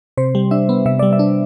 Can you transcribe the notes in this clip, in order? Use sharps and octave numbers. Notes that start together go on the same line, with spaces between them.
C3 C5
G3
D4 E5
B3
C3 E5
G3 D5
E5
D4